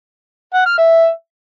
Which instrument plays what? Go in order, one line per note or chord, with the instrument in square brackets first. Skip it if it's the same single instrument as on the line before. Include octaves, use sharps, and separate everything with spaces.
[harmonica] F#5
F6
E5